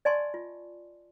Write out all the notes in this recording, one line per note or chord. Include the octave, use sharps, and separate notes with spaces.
D5 D#5 G#5 A5 C6 C#6
F4